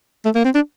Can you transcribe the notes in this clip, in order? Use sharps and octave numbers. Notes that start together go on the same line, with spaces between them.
A3
A#3
C4
D4